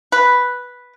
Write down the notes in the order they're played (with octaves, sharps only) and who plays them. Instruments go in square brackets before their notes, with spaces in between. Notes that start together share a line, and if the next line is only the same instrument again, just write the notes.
[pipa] B4